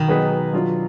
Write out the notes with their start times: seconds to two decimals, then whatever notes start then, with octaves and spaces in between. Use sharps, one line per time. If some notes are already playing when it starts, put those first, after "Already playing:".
Already playing: B2 D#3
0.08 F#3 B3 D#4 G#4 B4
0.53 F#3 D4 F4